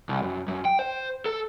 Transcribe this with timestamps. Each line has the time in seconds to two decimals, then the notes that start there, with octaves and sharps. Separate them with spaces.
0.09 C2
0.22 F#2
0.48 F#2
0.65 G5
0.79 C5
1.26 A4